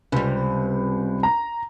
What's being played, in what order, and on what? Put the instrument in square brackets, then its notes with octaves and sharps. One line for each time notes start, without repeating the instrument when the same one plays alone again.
[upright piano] C#2 [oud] C3 G3
[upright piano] A#5